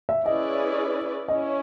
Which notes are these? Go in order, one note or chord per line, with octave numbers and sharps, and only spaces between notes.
E5
C#4 E4 G#4 B4 D5 D#5
C#4 E4 D#5